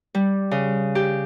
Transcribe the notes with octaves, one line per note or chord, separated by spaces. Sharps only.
G3
C#3
G4